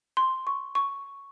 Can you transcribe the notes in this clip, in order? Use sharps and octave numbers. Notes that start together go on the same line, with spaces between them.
C6
C#6
C#6